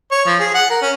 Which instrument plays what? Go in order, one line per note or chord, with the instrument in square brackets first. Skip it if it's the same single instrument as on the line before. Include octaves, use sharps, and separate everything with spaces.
[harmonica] C#5
F3
G#4
F#5
A#4
C#4